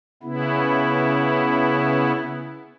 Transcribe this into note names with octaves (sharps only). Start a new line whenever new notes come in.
C#3 B3 E4